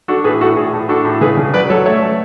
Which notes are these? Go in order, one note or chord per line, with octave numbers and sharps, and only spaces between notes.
D4 F#4 A4
A2 G#4 B4
A2 F#4 A4
A2 G#4
A2
D4 F#4 A4
A2
C#3 G#4 B4
C#3
F#3 B4 D5
F#3 A4 C#5
A3 C#5 E5
A3